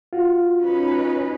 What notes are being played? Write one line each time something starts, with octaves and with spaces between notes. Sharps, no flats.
F4 F#4
C#4 D#4 B4